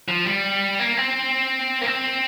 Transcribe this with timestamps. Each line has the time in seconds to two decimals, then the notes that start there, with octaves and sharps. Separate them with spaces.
0.08 F3
0.25 G3
0.79 A#3
0.97 C4
1.81 A#3
1.86 C4